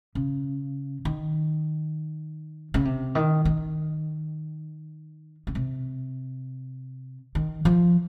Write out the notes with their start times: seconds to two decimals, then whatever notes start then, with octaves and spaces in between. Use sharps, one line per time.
0.15 C#3
1.05 D#3
2.74 C#3
2.85 C3
3.15 D#3
3.45 D#3
5.47 C#3
5.55 C3
7.35 D#3
7.65 F3